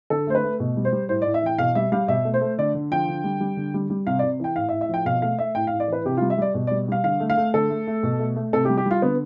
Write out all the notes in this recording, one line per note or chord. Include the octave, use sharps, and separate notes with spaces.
D3 A4
A3 C5
B4
A3
B2
G3
C5
G3
A2 C5
D5
A2
E5
E3 G5
B2 F5
G3 E5
G3 F5
B2 E5
A3
C5
A3
D3 D5
D3
F3 G5
D3
G3
G3
D3
G3
G3
C3 F5
D5
C3
E3 G5
A2 F5
E5
A2
E5
F3 G5
B2 F5
A3 F5
A3 E5
A2 G5
F5
A2
D5
E3 B4
C3 G4
F4
G3
E5
G3 D5
B2
D5
G3
G3 F5
D3 F5
A3
F5
A3
D3 A4
A3
A3
B2
A3
A3
C3 A4
G4
G3
G4
G3 F4
D3 B3